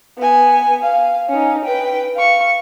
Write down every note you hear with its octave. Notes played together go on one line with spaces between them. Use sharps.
B3 G#5
F5
C#4 D#4
B4 G5
F5 C#6